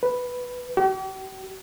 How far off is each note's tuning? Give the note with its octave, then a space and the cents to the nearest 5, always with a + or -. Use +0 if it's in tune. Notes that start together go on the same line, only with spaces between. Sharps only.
B4 +0
G4 -40